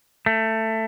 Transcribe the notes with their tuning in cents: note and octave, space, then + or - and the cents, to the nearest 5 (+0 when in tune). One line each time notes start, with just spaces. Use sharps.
A3 +15